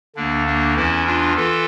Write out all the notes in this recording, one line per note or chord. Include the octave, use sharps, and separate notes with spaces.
D2 D3 A#3 D4
A#3 D4
E2 E3 C#4 E4
D4 F4
E3 F4 A4